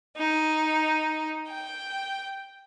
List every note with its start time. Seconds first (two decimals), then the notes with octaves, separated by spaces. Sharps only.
0.17 D#4
1.48 G5